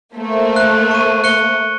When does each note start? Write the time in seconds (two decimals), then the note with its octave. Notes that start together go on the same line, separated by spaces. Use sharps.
0.15 A3 A#3 C5
0.56 F#6
0.91 C#6 D#7
1.24 F#6 C#7 G7